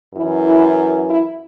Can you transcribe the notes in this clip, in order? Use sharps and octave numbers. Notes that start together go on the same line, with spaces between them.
F#2 E3 E4
E4
E4